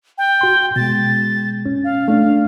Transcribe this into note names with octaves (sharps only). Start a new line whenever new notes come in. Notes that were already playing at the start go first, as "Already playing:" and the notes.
G5
F#4 C6
B2 G#3 A6
C#4
F5
A3 D4